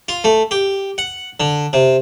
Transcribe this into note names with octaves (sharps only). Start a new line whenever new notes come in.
F4
A3
G4
F#5
D3
C3